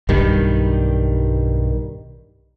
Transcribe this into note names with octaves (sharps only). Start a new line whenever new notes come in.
B1 G2 D#3 G3